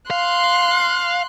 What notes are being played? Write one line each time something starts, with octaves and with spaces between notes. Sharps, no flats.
F5 C6 F#6